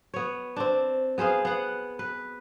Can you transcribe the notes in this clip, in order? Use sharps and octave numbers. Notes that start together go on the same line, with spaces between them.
B3 C#5
C4 D4
B3 G#4 C5 F5
B3 F#5
B4